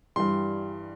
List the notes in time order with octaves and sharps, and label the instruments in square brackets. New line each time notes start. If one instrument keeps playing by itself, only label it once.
[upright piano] G2 E3 G3 C6